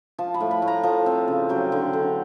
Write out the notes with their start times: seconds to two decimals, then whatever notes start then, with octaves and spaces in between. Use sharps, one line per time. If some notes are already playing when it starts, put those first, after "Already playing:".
0.18 F3 A5
0.34 B5
0.41 A2
0.51 B5
0.62 A2
0.68 A#5
0.83 F3 A5
1.06 C4
1.28 C#3
1.49 F#3 G5
1.72 D3
1.93 D3